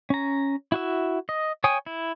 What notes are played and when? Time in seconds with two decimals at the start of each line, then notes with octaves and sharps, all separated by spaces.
0.10 C#4 A#5
0.72 E4 F#4 E5
1.29 D#5
1.64 C#5 G5 G#5 D#6
1.86 E4